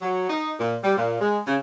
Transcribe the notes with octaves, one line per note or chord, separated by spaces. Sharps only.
F#3
D#4
A#2
G3
A#2
G#3
C#3